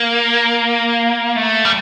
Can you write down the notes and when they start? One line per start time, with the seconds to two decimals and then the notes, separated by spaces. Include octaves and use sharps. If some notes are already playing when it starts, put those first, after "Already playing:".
Already playing: A#3
1.36 A3
1.65 G3